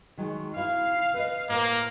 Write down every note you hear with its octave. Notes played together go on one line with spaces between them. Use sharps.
D#3 F#3 G#3
C4 E4 F#4 F5
B4 D#5
A2 A#3 A#4 C5